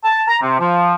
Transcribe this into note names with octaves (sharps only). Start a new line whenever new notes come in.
A5
A#5
C3
F3